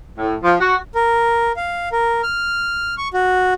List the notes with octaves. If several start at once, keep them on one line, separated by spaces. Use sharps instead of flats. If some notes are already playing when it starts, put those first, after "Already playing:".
A2
F3
F#4
A#4
F5
A#4
F6
C#6
F#4